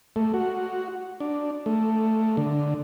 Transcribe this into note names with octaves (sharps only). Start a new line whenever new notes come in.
A3
F#4
D4
A3
D3